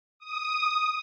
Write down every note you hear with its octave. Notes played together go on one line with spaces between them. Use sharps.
D#6